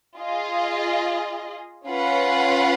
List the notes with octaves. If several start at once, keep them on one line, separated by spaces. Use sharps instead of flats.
F4 G#4 D#5
C#4 F4 B4 F#5